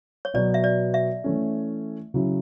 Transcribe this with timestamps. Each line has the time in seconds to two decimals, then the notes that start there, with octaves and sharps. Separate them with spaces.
0.25 C#5
0.34 B2 F#3 B3 F#4 D5
0.54 E5
0.64 D5
0.94 E5
1.24 E3 A3 C#4
2.14 C#3 F#3 C#4 E4